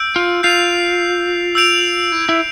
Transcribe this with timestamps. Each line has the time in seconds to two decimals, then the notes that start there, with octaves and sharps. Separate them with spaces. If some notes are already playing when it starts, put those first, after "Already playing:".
Already playing: E6 G6 D7
0.16 F4
0.43 F4 G6 C7 F7
1.55 E6 G6 D7 F7
2.12 E4
2.29 E4